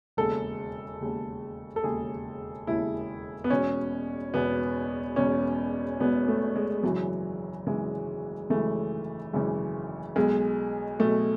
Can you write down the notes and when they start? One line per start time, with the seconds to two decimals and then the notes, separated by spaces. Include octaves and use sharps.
0.17 E1 D#2 C#3 A4
1.01 E1 D#2 C#3
1.76 A4
1.84 E1 D#2 C#3 G#4
2.67 E1 D#2 C#3 E4
3.44 B3
3.50 E1 E2 B2 C#4
4.34 E1 E2 B2 B3
5.16 E1 E2 B2 C#4
6.00 E1 E2 B2 B3
6.28 A3
6.56 G#3
6.83 G#1 F#2 C#3 E3 F#3
7.67 G#1 F#2 C#3 E3 G#3
8.50 G#1 F#2 C#3 E3 A3
9.33 G#1 F#2 C#3 E3
10.16 B1 B2 G#3
11.00 B1 B2 A3